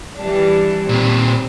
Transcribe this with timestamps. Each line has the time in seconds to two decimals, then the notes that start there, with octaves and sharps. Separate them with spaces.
0.17 E3 G3 D4
0.89 A#2 G3 C4